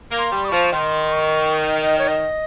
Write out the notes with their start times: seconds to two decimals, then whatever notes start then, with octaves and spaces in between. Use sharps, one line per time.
0.11 A#3
0.18 C6
0.32 G3
0.45 D#6
0.48 F3 C#6
0.72 D#3 C6
1.12 C#6
1.81 D#5
1.98 C#5
2.08 D#5